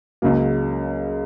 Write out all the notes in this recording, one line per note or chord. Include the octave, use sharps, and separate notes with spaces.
C#2 C#3 F#3 A#3